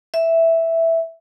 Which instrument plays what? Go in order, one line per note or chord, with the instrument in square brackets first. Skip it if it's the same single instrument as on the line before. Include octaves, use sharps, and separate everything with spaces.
[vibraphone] E5